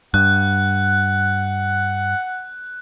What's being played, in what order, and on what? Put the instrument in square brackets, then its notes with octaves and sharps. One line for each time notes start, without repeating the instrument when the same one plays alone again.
[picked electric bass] G2 [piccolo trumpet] F#5 [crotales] F#6